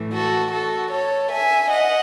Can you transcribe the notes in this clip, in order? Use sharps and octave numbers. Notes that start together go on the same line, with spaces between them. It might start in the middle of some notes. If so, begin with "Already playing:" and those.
Already playing: A2 E3 A3
F#4 A4
F#4 A4
A4 C#5
E5 G#5
D#5 F#5